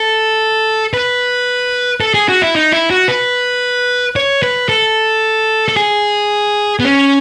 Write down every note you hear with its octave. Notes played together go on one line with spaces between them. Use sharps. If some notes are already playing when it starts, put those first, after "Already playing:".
Already playing: A4
B4
A4
G#4
F#4
E4
D#4
E4
F#4
B4
C#5
B4
A4
A4
G#4
B3
C#4